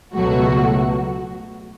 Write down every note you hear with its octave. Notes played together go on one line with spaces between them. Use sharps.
C#2 B2 F#3 A3 F#4